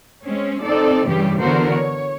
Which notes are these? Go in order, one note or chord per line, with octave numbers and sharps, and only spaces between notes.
G#3 C4 C#4
C4 D#4 A4 D5
G2 C#3 E3 G3 G4
D3 E3 B3 F#4 A#4 C5
C#5